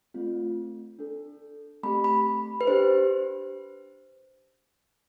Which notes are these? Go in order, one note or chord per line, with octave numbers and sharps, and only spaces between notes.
A3 C4 F4
D4 A4
A3 C4 G4 B5
B5
B4
D4 G4 C5